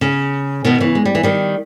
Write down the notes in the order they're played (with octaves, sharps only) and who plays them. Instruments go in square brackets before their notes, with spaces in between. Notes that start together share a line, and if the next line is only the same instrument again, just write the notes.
[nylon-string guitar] C#3
B2 D#3
C#3 E3
G#3
G3
E3
D#3 G3